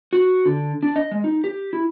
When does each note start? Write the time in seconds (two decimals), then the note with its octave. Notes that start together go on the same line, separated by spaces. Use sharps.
0.13 F#4
0.45 D3
0.83 D4
0.96 D#5
1.11 G#3
1.24 D#4
1.44 G4
1.73 E4